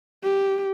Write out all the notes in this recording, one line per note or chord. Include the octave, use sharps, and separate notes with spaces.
G4